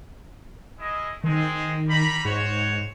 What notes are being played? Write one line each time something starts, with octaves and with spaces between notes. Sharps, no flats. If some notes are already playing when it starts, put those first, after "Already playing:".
G#3 E4 D#5
D#3 G#3 C4
G3 A#5 B5
G#2 F#4 C5 C#5